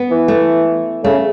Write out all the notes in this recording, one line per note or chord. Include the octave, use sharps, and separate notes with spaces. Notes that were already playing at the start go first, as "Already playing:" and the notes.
Already playing: B3
E3
A3
C#3 A3